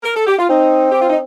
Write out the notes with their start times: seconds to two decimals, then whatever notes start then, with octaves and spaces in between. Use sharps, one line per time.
0.04 A#4
0.16 A4
0.27 G4
0.39 F4
0.49 C4 D#4
0.92 G4
1.01 F4
1.09 D#4